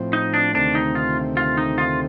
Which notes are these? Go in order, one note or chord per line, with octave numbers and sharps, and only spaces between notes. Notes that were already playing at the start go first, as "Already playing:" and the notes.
Already playing: A2 F3 C4
D#4
D4
D2 C3 D#3 A3 C4 D4
D#4
F4
F4
D#4
F4